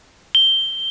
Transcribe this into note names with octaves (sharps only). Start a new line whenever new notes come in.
G7